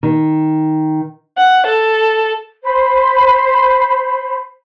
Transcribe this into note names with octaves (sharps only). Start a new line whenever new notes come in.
D#3
F#5
A4
C5 B5